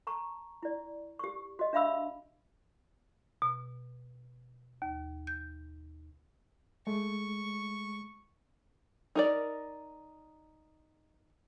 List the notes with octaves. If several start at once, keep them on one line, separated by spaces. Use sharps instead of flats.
A5 A#5 C#6
E4 D5
G4 C#6
F#4 D#5
D4 E5 F5 B5 E6
B2
D#2
G6
G#3 A3 C#6
D#4 A#4 D5